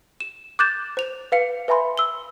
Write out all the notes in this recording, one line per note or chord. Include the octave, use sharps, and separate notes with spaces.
E7
D6 F#6 G6 A6 E7
C5 F7
B4 F5 C#7
B4 E5 G#5 B5 C6
E6 G7